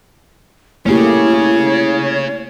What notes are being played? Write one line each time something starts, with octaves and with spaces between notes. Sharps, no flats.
A3 A#3 C#4 E4 G4 G#4 C#5